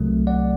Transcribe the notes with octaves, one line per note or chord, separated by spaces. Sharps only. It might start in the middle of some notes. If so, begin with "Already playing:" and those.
Already playing: C2 C3 F#3 A3
D5 F#5